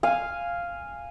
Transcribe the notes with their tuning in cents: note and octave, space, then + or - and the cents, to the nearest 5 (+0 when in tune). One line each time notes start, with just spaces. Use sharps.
F5 -5 G#5 -10